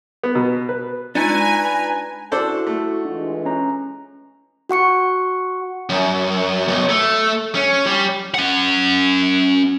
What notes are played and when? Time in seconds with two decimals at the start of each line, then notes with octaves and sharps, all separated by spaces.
0.24 B3
0.35 B2
0.69 B4
1.15 G#3 D4 D#4 F4 B4 G#5 A#5
2.32 D4 E4 F#4 A4 C5
2.67 A3
3.05 E3 G#3 D4 F4
3.45 C#4 A#5
4.69 F#4 F#5 C#6 C#7
5.90 F#2
6.68 B1
6.89 A3
7.55 C#4
7.86 G3
8.34 C#4 F#5